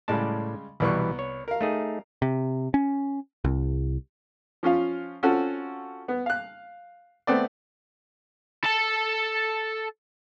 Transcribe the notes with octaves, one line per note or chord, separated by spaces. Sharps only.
A2 C#3 G3 G#3 D5 A5
C2 B2 E3 G3 B3 C#6
C#5
A#4 F5
A3 D#4 G#4
C3
C#4
C2
F3 C#4 F4 F5
C4 C#4 F4 F#4 A4
B3
F5 F#6
A3 B3 C4 D5
A4 A5